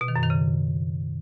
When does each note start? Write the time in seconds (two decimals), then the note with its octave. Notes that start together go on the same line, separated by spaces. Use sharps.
0.01 B2
0.08 D#3
0.16 F#2
0.23 D#3
0.30 C#3